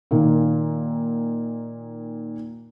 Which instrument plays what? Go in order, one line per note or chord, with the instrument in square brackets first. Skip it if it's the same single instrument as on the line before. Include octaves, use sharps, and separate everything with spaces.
[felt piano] A#2 D#3